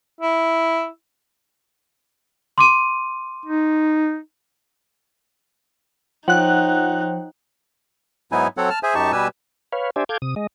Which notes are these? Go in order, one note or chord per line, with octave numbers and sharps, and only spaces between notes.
E4
C6 D6 D#7
D#4
F3 D#4 C5 C#5 F#5 G5 F#6
G#2 F#3 B3 D#4 E4 G#5
F#3 C4 A4 C#5 F#5
A5 F6
G#4 C5 E5 G#5
F#2 D#4 G4 A5 C#6
B2 G3 G4 B4 G#5 E6
B4 C#5 F5
D4 G4 C5 D5 E5 G#5
A4 F5 D6 G6 G#6
C3 D#6
G#3 D#5